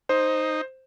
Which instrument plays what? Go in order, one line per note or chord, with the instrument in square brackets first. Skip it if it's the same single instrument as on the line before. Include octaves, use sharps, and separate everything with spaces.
[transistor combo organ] D#4 [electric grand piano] C5